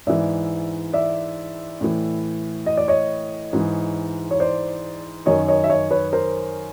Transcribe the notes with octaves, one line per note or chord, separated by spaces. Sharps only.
G#2 E3 D5 E5
D5 E5
A2 E3
D#5
D5
C#5 D#5
G#2 E3
C#5
C5 D5
F#2 D#3 C#5 D#5
C#5 D#5
E5
C#5 D#5
B4 C#5
A#4 C5